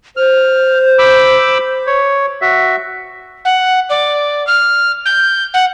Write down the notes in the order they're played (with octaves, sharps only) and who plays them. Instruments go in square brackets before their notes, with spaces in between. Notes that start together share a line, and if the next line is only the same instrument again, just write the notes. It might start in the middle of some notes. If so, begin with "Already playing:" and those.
[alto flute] C5 [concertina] F6
[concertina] B5 D6 E6
C#5
F#4 E5
[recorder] F#5
D5
F6
G6
F#5